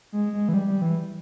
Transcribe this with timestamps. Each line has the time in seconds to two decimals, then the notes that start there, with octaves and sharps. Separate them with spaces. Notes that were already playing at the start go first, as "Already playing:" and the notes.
0.12 G#3
0.33 G#3
0.49 E3
0.54 G3
0.67 G3
0.82 E3